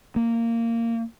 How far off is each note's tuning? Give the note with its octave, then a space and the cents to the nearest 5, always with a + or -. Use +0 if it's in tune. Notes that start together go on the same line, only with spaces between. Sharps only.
A#3 -15